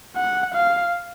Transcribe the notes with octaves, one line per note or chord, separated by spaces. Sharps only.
F#5
F5